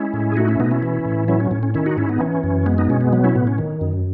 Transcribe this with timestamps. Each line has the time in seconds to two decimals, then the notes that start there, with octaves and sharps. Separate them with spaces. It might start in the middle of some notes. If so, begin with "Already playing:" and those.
Already playing: G#3 C#4 E4
0.14 A2
0.32 G#4
0.37 A3 D#4 F#4
0.48 C#4 E4
0.60 B2 B3 D#4
0.71 C#4 E4
0.83 E3
1.05 A2
1.28 F#3 C#4 E4
1.40 C#4
1.51 A2 C#4
1.63 C#4
1.74 D#3 C#4 E4
1.86 D#4 F#4
1.97 G#2 C#4 E4
2.09 B3 D#4
2.20 E3 C#4
2.43 F#2
2.66 G#3 B3
2.78 B3 D#4
2.90 B2 C#4
3.01 B3
3.13 F#3 B3
3.24 C#4 E4
3.35 A2 B3
3.47 C#4
3.58 D#3
3.81 F#2